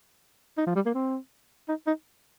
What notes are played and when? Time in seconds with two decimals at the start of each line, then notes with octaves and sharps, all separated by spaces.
0.57 D#4
0.67 F3
0.76 G3
0.86 A#3
0.94 C4
1.68 D#4
1.87 D#4